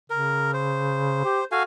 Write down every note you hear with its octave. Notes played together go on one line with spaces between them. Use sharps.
C#3 A#4
C5
G4
F#4 A4 F5 G#5